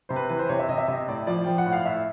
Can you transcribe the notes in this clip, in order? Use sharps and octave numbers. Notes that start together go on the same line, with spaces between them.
C3 C5
B4
E3 B4
C5
C3 C#5
E5
C3 D#5
E5
C3 D#5
A2 D5
F3 D5
F3 G5
F#5
A2
F5
A2 E5